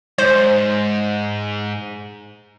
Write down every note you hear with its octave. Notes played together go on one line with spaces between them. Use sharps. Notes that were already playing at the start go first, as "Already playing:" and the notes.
G#2 C5